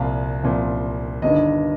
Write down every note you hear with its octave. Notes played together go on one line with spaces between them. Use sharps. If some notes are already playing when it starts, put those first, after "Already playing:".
Already playing: C2 A#2 F3 F5
C2 A#2 F3
G1 G2 D#3 D#5